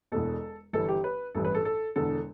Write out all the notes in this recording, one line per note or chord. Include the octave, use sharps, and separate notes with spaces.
E1 E2 B2 A4
G1 G2 E3 A4
G4
B4
A1 G2 E3 A4
B4
A4
A4
E1 E2 D3 A4